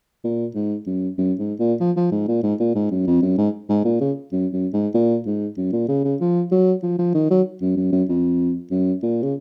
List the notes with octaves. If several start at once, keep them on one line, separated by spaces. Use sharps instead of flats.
A#2
G#2
F#2
F#2
G#2
A#2
F3
F3
G#2
A#2
G#2
A#2
G#2
F#2
F2
F#2
G#2
G#2
A#2
C#3
F#2
F#2
G#2
A#2
G#2
F#2
A#2
C#3
C#3
F3
F#3
F3
F3
D#3
F#3
F#2
F#2
F#2
F2
F#2
A#2
C#3